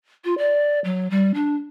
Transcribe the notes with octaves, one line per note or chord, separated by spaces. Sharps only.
F4
D5
F#3
G3
D4